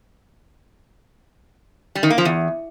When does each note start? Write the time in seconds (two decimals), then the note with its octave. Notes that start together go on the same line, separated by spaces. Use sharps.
1.95 G3
2.03 D#3
2.10 A#3
2.18 F3
2.25 E2